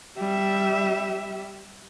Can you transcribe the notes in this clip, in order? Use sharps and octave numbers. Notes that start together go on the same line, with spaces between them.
G3 E5